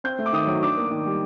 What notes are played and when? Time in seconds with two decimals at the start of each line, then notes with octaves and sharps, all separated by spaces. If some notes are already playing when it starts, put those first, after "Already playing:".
0.04 C4 G6
0.19 A3
0.26 D6
0.33 D#3 D#6
0.47 F#3
0.62 D4 D6
0.77 A#3
0.91 D#3
1.06 G3